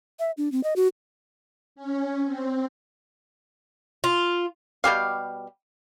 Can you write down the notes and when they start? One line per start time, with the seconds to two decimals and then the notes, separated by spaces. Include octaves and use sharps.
0.19 E5
0.37 D4
0.52 C4
0.63 D#5
0.76 F#4
1.76 C#4
2.24 C4
4.04 F4
4.84 B2 G3 G4 F5